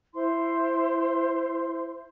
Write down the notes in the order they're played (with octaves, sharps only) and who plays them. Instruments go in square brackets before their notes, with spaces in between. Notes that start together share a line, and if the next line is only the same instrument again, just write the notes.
[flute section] E4 C5 C6